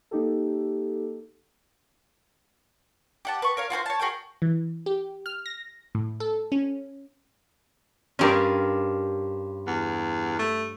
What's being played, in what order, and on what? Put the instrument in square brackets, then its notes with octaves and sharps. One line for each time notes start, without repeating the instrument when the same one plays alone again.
[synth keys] A#3 D#4 G4 A4
[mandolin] G4 F#5 A5
B4 C#6
A#4 C#5 F5
F4 F#4 G#4 C5
C#5 A5
F#4 G#4 A#4 G5
[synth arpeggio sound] E3
G4
F6
A#6
A2
A4
C#4
[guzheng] G2 F4 [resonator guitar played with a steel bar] C#4 G4 A#4
[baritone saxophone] E2
A3